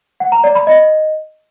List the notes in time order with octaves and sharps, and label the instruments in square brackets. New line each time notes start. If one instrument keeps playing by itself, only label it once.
[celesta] F#5
A#5
D5
B5
D#5